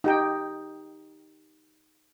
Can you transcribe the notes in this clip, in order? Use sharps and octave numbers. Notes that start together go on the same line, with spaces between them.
D#4 G4 G5